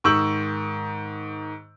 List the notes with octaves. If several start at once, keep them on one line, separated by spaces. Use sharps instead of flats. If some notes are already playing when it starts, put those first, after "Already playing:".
G#2 D#3 C#6 E6 G6 F#7